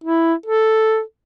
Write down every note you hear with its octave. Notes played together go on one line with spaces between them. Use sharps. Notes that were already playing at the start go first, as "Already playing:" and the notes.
E4
A4